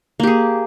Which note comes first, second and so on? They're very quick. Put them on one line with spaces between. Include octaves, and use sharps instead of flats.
A#3 G4 G#4